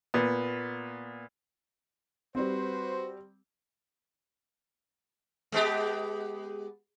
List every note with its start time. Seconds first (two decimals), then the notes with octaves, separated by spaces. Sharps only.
0.14 A#2 B3
2.35 G3 C4 F#4 B4 C5
5.52 G#3 B3 G4